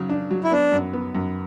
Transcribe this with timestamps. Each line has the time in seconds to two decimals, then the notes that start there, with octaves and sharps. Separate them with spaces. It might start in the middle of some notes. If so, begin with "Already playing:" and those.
Already playing: C#3 F#3
0.10 D4
0.31 F#3
0.44 E4
0.51 B3 D4
0.72 F#2
0.93 B3
1.15 F#2